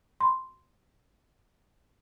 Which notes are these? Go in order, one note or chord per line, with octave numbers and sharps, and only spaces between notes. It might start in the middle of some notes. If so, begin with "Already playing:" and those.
B5 C6